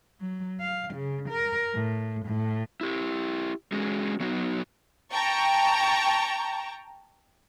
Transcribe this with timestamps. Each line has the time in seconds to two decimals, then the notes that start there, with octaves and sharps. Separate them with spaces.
0.21 F#3
0.60 F5
0.94 C#3
1.29 A#4
1.74 A2
2.25 A2
2.81 E4 G4
3.72 G#3 C#4 F#4 G#4
4.20 F#3 B3 D#4 F#4
5.12 G5 A5 A#5 C#6